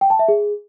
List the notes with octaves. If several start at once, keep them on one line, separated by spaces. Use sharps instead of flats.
G5
A5
E5
G#4